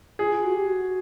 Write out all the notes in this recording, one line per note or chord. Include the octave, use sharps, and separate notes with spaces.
F4 G#4
F4
F#4
G4
F#4